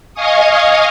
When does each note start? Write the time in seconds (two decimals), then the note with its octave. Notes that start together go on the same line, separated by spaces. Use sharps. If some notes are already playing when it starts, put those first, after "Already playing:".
0.14 D#5 F5 G#5 C#6 D#6